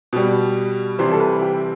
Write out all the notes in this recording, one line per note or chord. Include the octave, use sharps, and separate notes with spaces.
B2 G3
C3 E3 G3 C5
A4
B4
G4